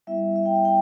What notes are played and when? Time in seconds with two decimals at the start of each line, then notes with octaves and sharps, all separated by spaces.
0.07 G3 B3 E4 E5
0.36 E5
0.45 G5
0.55 E5
0.65 G5